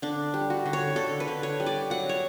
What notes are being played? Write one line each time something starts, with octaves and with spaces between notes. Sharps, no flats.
D3 D4
G3
F#4
D3
C#5
D3 A4
B4
D3
C#5
G3
D5
F#3 F#5
C#5